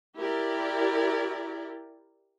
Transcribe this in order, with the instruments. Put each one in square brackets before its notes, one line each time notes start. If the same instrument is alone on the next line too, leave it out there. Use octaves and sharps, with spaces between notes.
[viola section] E4 G4 A#4 D5